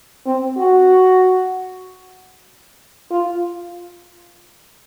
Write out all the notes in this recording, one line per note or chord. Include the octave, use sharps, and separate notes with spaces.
C4
F#4
F4